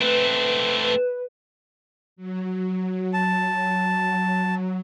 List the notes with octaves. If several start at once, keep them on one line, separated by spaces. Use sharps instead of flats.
A3 C4 B4
F#3
A5